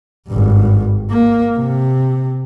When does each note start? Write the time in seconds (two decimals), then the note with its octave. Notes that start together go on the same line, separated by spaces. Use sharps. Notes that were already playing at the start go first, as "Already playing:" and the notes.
0.28 G#1 G2
1.10 A#3
1.57 C3